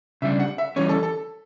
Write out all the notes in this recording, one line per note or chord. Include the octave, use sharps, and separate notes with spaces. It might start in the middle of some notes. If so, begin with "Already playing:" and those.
C#3 G3 D4 E5
F#5
E5
E3 G3 C#4 C#5
A4
A4